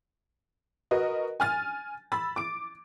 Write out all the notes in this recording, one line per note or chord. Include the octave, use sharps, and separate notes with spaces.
F#4 A#4 B4 D#5
G#5 F6 A6
B5 E6 A6
D6 D7